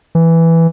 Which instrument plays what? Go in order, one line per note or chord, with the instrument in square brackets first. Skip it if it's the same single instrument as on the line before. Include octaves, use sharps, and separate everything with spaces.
[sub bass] E3